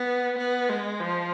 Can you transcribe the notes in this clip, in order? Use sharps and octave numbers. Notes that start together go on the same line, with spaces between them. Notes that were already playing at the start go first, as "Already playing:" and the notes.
Already playing: B3
B3
G#3
F3